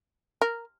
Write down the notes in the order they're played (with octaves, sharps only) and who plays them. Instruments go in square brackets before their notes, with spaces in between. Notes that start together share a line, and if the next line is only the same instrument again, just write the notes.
[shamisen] A#4